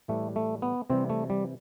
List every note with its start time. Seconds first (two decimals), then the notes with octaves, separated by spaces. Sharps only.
0.08 A2 E3 G3 A3
0.36 A3
0.62 B3
0.90 C3 E3 G3 C4
1.10 A3
1.30 G3